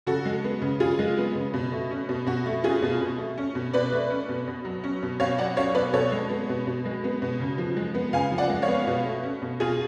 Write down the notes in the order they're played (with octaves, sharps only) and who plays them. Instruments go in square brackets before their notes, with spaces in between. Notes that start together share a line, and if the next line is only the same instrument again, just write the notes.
[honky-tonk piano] C#3 F#4 A4
G#3
B3
C#3
C#3 F4 G#4
G#3
B3
C#3
B2
A3
C#4
B2
B2 F#4
A3
C#4 F4 G#4
B2
B2
A3
C#4
B2
B2 B4 D5
A3
C#4
B2
B2
F#3
C#4
B2
B2 C#5 F5
F#3 D5 F#5
C#4 C#5 F5
B2 B4 D5
B2 A4 C#5
G#3
B3
B2
B2
G#3
B3
B2
C#3
F3
G#3
B3
C#3 F5 G#5
F3
D5 F#5
G#3
C#5 F5
B3
B2
A3
C#4
B2
B2 F4 G#4